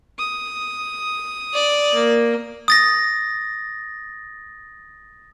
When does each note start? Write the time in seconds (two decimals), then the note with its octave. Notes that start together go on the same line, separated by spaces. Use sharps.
0.19 D#6
1.54 D5
1.94 A#3
2.68 D#6 A6 A#6